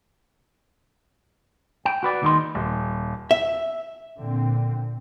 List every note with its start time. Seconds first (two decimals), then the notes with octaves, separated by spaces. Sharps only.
1.85 G5
2.03 F#4 B4 D5
2.22 D#2 D#3 G#3 D#4 D#5 C6
2.55 D#1
3.31 E5
4.19 A#2 D3 C4